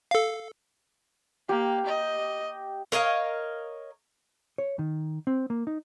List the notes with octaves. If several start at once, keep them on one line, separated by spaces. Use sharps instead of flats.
A4 F5
A#3 G4
D#5
A#4 C#5 D#5 F5
C#5
D#3
C4
A#3
D#4